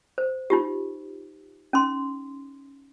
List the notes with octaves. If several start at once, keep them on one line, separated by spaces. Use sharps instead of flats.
C5
D#4 F4 G4
C#4 D#4 C6